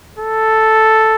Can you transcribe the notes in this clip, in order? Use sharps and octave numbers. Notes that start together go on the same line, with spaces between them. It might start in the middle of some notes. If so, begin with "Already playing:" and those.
A4